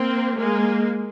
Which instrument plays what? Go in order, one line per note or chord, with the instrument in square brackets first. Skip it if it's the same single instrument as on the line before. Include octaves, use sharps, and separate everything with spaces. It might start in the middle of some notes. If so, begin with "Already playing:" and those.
Already playing: [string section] A#3 C4
G#3 A#3